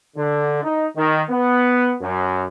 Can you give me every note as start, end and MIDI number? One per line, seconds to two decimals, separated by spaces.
0.17 0.60 50
0.63 0.85 63
0.96 1.23 51
1.30 1.94 59
2.02 2.46 42